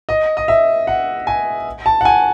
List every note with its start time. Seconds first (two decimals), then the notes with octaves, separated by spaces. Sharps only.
0.09 D#5
0.37 D#5
0.48 E5
0.87 F#5
1.27 G#5
1.86 A5
2.01 F#5
2.05 G#5